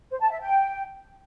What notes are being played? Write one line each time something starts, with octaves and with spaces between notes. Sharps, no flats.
C5
A5
E5
G5